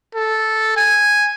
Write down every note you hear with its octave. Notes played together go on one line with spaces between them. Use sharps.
A4
G#5